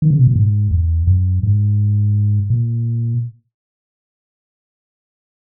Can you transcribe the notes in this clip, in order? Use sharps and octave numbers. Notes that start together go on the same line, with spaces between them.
D#3
C#3
B2
A#2
G#2
E2
F#2
G#2
A#2